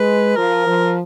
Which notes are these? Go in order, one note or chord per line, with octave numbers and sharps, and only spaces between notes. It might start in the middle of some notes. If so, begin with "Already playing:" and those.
Already playing: G#3 B4
F3 A#4
F3